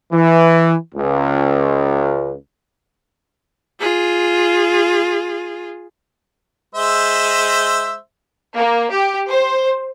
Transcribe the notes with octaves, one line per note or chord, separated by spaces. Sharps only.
E3
C#2
F4 G#4
G#3 C5 E5
A#3
G4
C5